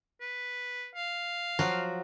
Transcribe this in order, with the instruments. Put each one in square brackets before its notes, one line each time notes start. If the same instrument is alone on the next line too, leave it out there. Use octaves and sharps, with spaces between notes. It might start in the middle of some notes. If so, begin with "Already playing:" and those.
[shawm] B4
F5
[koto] F3 F#3 F#4